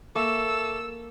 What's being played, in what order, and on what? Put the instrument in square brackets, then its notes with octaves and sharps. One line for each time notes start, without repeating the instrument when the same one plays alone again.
[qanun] A#3 [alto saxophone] A4 [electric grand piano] E5 C#6 D6 [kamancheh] E6